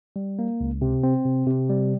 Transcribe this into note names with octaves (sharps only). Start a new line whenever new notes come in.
G3
A#3
C#2
C3
C4
C3
C3
G3